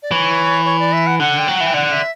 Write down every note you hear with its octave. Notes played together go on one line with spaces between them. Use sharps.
D5
E3 C#5
C#5
D5
E5
F#5
D3 F#5
G5
F#3
E3 F#5
G5
D3 F#5
E5